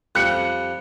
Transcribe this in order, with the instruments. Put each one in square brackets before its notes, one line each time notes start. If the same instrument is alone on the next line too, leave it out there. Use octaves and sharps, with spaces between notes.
[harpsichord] F2 G3 [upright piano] F#6 C#7